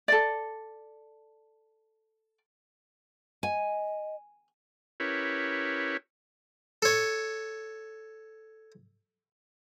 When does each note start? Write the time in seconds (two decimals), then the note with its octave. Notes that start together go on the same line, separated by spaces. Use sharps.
0.08 A4 D5
3.43 D#5 G#5
5.00 C#4 E4 G4 A#4 B4 C#5
6.82 A4 C#5